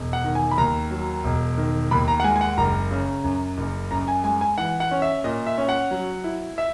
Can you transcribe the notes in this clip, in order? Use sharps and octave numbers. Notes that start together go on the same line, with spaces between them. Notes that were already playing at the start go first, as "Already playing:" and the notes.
Already playing: E1
F#5
D#3
G#5
B5
D#2 A#5
F#3
E1
D#3
D#2 B5
A#5
F#5
G#3 G#5
G#5
F#5
F#1 A#5
C#3
F#2
F#1
F#2 A#5
G#5
G#3 G#5
G#5
E3 F#5
F#5
C#4
E5
A#2 D#5
E5
C#4
F#5
F#3
E4
E5